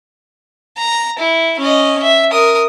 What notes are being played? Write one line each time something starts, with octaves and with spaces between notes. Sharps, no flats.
A#5
E4
C#4 D#5
E5
A#4 D#6